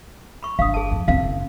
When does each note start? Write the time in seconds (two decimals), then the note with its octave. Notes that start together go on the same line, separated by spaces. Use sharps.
0.43 B5 C#6
0.59 G1 F5 D#6
0.74 G#4 A5
0.91 F2
1.08 F#1 C4 F5